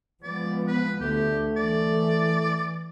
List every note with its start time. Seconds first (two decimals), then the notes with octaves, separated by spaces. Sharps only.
0.23 F3 G#3 B3 D5
0.67 B4
1.00 D2 D3 A3 G4
1.57 E3 D5